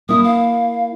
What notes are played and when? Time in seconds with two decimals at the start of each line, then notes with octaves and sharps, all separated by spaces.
0.09 A#3 E4 D#6
0.24 F5